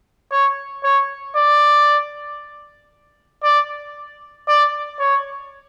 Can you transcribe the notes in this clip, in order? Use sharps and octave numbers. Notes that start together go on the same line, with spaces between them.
C#5
C#5
D5
D5
D5
C#5